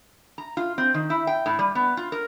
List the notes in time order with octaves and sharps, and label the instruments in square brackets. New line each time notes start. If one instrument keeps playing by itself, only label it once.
[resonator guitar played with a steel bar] A#5
F4
C4
D#3
E4
G5
A2
G3
B3
F4
A#4